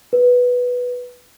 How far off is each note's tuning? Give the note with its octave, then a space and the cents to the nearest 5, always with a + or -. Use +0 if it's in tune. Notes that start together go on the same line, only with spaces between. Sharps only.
B4 -5